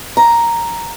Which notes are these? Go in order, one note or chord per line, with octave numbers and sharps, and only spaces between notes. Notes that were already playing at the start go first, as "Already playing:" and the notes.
A#5